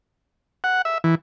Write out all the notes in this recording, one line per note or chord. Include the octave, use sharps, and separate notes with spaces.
F#5
E5
E3